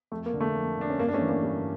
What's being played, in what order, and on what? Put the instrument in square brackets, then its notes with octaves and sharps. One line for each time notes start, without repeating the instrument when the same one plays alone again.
[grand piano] F2 A3
A#3
D3
A3
F2
D3 D4
C#4
G2 A#3
D4
A3 C#4
E3
A#3 D4
G2